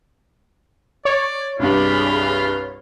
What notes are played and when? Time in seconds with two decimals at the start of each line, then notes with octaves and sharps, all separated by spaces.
1.05 C#5 D5
1.59 C2 G2 D4 F4 G#4 B5